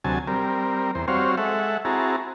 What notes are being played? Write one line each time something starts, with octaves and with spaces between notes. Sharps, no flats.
D2 C3 F#3 G#5 A5
G3 C4 A#4
E2 C5
G3 C4 F#4 C5 C#5 F5
G#3 A4 E5 F#5
C4 E4 F#4 G#4 A5 A#5